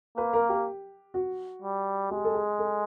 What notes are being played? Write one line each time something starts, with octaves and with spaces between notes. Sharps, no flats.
A#3 B4
A#4
G4
F#4
G3
G#3 G4
A4
G#4
A4